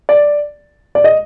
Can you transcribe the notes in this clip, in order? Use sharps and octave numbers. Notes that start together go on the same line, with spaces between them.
D5
D5
D#5